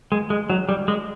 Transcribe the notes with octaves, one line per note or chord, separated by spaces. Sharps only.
G#3
G#3
F#3
G3
G#3